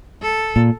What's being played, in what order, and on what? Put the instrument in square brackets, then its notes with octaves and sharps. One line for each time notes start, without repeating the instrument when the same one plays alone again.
[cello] A4
[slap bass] A#2